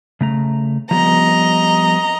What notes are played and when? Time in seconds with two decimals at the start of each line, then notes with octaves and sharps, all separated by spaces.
0.21 C#3 A3 A#5
0.91 F3 G3 B3 D#5 A#5